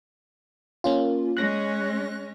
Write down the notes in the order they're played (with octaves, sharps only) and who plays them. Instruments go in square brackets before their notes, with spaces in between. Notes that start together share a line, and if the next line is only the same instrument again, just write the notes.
[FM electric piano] A#3 C#4 F4
[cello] G#3 C#4 [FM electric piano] F#6 A#6